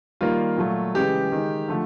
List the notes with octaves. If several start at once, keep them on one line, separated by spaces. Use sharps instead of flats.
D#3 G3 A#3 F4
A#2 F#3 A3
C#3 E3 G#3 G4
D#3 G#3
D3 F3 A3